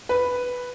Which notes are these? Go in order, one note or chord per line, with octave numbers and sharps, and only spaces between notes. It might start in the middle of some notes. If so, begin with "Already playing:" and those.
B4